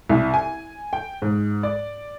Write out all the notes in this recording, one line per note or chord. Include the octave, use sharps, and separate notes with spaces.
C2
G#5
G5
G#2
D5